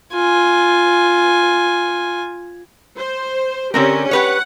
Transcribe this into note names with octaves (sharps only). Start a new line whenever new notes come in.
F4 G#5
C5
D3 C4 C#4 G4 A#4
G4 B4 C#5 F#5